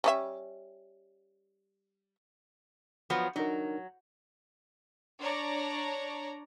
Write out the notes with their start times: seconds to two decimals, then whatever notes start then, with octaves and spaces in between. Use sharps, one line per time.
0.04 G3 C#4 E5
3.10 F3 F#3 B3
3.36 F#3 D4 D#4 A#4
5.20 D4 C#5 D5 A#5